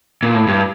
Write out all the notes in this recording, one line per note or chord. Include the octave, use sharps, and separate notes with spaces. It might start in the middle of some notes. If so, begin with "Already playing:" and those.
A#2
A2
G2